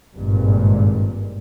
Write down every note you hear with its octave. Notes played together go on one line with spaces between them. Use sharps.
G#1 G2 A#2